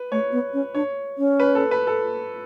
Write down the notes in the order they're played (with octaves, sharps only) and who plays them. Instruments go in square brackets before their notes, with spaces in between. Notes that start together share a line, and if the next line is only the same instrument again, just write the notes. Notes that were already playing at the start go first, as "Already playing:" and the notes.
Already playing: [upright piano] B4
[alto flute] A3 [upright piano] C#5
[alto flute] B3
C#4
[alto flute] D4 [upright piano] C#5
[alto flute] C#4
[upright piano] B4
A4
B4
A4